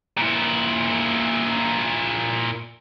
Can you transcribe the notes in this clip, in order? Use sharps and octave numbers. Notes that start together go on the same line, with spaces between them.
A#2 E4